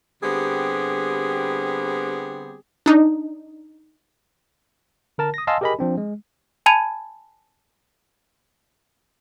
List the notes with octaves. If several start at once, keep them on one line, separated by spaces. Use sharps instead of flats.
D3 G3 B3 C4 G4 G#4
D4 D#4
D3 A#4 A5
D#6 A#6
D#5 F5 G#5 A5 C6 E6
G4 G#4 A#4 D#5 G#5 B5
F3 C4 D4
G#3
G#5 A5 B5 G#6 D#7 F7